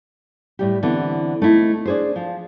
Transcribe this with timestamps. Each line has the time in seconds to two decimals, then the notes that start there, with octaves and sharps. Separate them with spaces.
0.59 A2 G3 G4
0.83 D3 E3 B3 C4
1.42 A3 C4 D#4 E4
1.85 D4 G#4 C5
2.16 F3